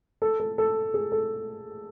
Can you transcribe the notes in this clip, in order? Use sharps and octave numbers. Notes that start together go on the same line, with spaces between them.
A4
A4
A4
G#4
A4